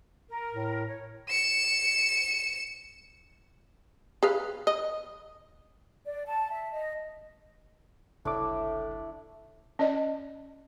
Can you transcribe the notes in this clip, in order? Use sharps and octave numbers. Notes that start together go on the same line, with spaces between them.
A#4
A2
C#5
C#7 E7
G#4 B4 F5
D#5
D5
A5
E5
D#5
F#1 C2 A2 A3 D4 E4 D6
C#4 D5 D#5